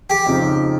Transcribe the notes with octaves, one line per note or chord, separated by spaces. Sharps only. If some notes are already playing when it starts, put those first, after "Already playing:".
G4
F2 C#3 F3 C4 D#4